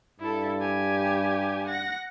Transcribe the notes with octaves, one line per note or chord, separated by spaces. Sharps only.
G2 E4 A4
G4 G#5
F#5 A#6